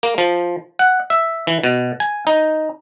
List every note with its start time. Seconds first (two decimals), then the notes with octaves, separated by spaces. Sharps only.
0.03 A#3
0.18 F3
0.79 F#5
1.10 E5
1.47 E3
1.63 B2
2.00 G#5
2.27 D#4